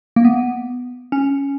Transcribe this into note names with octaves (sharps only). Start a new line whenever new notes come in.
A#3
B3
C#4